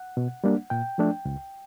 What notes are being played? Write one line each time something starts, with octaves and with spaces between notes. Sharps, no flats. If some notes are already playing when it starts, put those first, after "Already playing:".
Already playing: F#5
B2
G3 A#3 D4
A#2 G5
F3 A3 D4
C#2